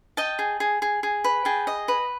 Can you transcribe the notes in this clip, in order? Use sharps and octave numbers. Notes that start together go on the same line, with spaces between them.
D#5 G5 A5
G#4
G#4
G#4
G#4
B4
G#4 G5 A5
D#5
B4